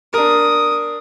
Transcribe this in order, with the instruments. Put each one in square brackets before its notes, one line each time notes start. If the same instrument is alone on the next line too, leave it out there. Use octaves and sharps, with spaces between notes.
[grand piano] D4 A#4 [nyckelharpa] D#6